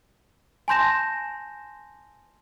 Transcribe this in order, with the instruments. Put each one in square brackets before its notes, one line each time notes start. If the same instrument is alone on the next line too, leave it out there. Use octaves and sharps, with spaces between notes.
[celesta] G#5 A5 C6 G6 A#6 E7